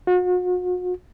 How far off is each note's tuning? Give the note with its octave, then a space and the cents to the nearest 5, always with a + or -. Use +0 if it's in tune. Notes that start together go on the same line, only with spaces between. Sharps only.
F#4 -40